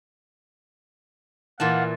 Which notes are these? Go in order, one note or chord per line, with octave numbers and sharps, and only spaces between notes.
A#2 E3 F5 F#5 A5